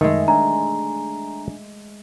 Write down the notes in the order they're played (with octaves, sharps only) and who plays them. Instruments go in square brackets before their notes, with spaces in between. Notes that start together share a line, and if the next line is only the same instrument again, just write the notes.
[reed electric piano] F#2 D#5 [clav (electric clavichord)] D#3 [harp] G#3 A3
[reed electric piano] D4 G#5 [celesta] A#5